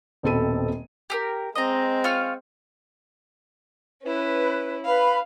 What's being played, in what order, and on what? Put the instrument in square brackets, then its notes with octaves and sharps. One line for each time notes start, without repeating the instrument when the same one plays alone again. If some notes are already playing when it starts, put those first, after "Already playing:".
[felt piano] D#1 B2 C4 A4 B5 D#7
[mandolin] G4 G#4 A#4
[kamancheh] G#3 C4 [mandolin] D#5 A#5
[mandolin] F4 C#5 F6
[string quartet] C#4 E4 [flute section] B4
[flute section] B4 B5 [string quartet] F5